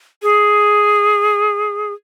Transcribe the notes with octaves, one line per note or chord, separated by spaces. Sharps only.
G#4